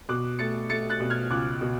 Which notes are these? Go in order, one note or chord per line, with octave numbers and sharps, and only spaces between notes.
B2 D6 F#6
A3 A6 C#7
A3 A6 C#7
F#6 A6
B2
F6 G#6
C#2 D6 F#6
B2